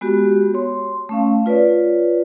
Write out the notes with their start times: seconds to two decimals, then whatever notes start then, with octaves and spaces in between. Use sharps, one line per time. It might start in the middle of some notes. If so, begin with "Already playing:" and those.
0.01 G#3 B3 F#4 G4
0.54 C#5 C6
1.09 A3 C#4 F5
1.46 F4 B4 C#5 D5